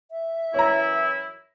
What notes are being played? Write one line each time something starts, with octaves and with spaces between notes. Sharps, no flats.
E5
F#2 E3 E4 C#5 A#5